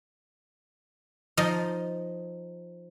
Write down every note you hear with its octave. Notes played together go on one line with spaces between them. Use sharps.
F3 D#4 D#5